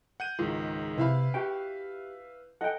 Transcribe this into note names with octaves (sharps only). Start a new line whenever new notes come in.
F#5 G6 D#7
C#2 G#2 D#3 F4
C3 E4 B4 E5 F5 B5
F#4 G4 G5
A4 B4 D#5 F#5 G5